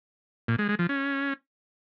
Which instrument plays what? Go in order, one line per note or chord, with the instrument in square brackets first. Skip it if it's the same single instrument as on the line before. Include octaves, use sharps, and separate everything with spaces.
[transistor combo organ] A#2
G#3
G#3
F3
C#4